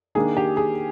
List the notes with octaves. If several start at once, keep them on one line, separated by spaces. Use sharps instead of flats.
D#3 A#3 D4 G#4
G4
G#4